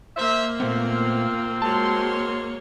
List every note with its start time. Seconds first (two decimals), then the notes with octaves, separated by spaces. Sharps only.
0.17 A#3 C5 E5
0.60 A#2 A3 B3 C4 F4 F5
1.62 G#3 A#3 F#4 C#5 A5 C6